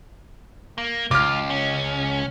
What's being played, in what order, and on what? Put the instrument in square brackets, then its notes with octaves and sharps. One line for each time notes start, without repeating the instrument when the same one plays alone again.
[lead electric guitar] A#3
[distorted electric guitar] C#2 [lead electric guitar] F4 [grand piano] D6 F6
[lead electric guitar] C#4